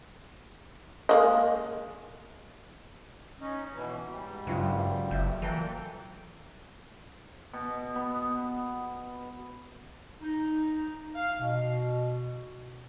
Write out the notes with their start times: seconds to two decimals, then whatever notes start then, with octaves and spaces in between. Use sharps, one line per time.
1.09 G#3 A#3 D#5
3.40 C#4 D#4
3.74 B2 E3
4.11 G#2 G3
4.47 F#1 G2 F4
5.11 F#1 E5 G6
5.42 A#2 E3 A4 G5 A#5 E6
7.53 B2
7.96 B3
10.22 D#4
11.15 F5
11.41 B2